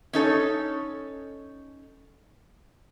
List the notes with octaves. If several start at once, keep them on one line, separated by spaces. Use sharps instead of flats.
C#4 D#4 A4 C#5